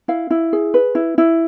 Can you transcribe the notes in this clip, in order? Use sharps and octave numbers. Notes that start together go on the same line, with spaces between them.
E4 F5
E4
G#4
B4
E4
E4